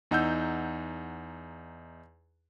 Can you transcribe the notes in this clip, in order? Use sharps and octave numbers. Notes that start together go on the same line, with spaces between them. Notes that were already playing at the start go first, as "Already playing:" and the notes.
E2 D#4 F#5 E6 G6